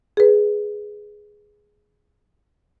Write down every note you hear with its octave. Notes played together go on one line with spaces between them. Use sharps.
G#4 B4